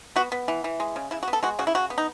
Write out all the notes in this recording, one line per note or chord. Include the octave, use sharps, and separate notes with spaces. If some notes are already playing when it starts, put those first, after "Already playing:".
B3 F#4
B3
E3
E3
G#3
C#3
C#3 E4
F#4
B3
A4
G#3 F#4
C#3 F#4
E4
C#3 F#4
B3
D#4